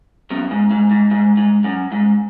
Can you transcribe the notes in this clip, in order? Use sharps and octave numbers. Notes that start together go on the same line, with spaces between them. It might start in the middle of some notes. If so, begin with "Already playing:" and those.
F#2 B2
G#2
G#2
G#2
G#2
G#2
F#2
G#2